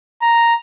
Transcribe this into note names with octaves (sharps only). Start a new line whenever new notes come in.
A#5